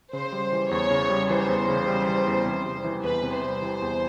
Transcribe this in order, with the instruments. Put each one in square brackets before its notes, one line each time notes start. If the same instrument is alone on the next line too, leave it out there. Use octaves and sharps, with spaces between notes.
[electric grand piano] C#3 [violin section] C5
[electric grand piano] G3
E3
[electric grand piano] E2 [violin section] C#5
[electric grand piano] C#3
G3
[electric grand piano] E3 [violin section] C5
[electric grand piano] E2
C#3
G3
E3
E2
C3
G3
E3
[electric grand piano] E2 [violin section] B4
[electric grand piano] C3
[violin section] C5
[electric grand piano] G3
E3
E2